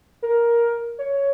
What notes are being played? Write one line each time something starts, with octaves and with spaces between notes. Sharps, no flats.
A#4
C#5